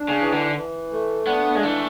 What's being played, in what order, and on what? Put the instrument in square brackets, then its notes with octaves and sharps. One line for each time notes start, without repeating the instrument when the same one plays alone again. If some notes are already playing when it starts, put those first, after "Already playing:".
Already playing: [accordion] D4
[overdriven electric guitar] C#3
[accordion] E3
[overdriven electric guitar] D3
[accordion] E3
A3
[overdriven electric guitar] B3 [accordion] D4
[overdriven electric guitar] G#3
[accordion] E3 [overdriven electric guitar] A3